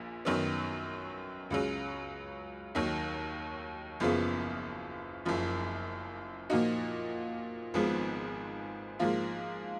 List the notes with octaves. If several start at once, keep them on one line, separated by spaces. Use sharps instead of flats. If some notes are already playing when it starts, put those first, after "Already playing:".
Already playing: A#1 A#2
F#2 D#3 F#3 B3
C#2 C#3 F#3
D#2 D#3 F#3
F#1 F#2 C#3 F3 B3
F#1 F#2 F3
A#2 F3 A#3 D#4 F#4
G#1 G#2 F3 B3
G#2 F3 A#3 F4